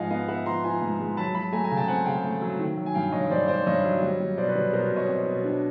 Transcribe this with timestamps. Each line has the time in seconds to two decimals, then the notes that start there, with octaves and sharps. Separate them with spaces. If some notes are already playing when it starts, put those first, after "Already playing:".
Already playing: G#2 F3 D#5 F5 F#5 G#5
0.10 B3 D#5 F5
0.28 B3 E5 F#5
0.46 F3 A#5 C6
0.64 F3 G#5 A#5
0.82 G#2
0.99 G#3
1.17 F#3 A5 B5
1.35 F#3 A5 B5
1.52 A3 G#5 A#5
1.64 G#5 A#5
1.71 C#3
1.76 G5 A5
1.88 C4 F#5 G#5
2.06 C#3 F5 G5
2.25 A3
2.42 F#3
2.59 D#3
2.77 F#3
2.86 G#5
2.95 G2 F5 G5
3.12 G2 C#5 D#5
3.30 G2 C5 D5
3.48 G2 C5 D5
3.66 G2 C#5 D#5
3.85 F#3
4.02 G3
4.20 G3
4.37 B2 C5 D5
4.49 B4 C#5
4.55 G3
4.73 B2 A#4 C5
4.91 B2
4.96 C#5 D#5
5.08 C4
5.26 B2
5.44 D4